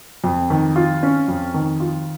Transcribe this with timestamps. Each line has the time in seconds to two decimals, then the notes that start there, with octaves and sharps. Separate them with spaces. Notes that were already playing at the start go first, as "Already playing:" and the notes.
0.24 F2
0.50 D#3
0.76 F4
1.03 C#4
1.28 F2
1.54 D#3
1.80 F4